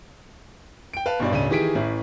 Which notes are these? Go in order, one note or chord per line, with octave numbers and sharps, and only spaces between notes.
G5 D7
B4 F5 A5
B1 G2 B2 D5
D1 C#3 D4 D#7
D#3 E3 G4 G#4 B6 D7
A1 A2